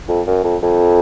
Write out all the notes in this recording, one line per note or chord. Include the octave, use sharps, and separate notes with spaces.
F2
F#2
F2
F2